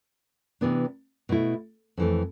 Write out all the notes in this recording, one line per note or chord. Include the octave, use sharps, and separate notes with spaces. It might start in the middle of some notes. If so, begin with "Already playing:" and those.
C3 E3 B3 D4
B2 A3 E4
F2 E3 A3